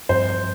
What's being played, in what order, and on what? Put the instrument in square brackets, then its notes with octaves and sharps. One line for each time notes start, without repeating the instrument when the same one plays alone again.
[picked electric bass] G2 F3 C4 [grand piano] C5